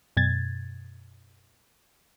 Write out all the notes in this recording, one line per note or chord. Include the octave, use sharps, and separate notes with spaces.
F#2 B2 G#6 A6